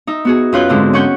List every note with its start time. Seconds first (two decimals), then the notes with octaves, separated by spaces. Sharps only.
0.07 D#4 E5
0.25 B3 F#4 G#4
0.53 F#2 C#4 F4 B4 F#6 G6
0.69 G#2 D3 C4 E4
0.94 C#4 F#5 C#6 G6